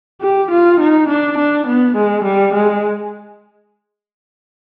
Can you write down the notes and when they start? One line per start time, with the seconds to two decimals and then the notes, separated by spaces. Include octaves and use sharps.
0.22 G4
0.51 F4
0.80 D#4
1.08 D4
1.38 D4
1.67 B3
1.96 G#3
2.24 G3
2.54 G#3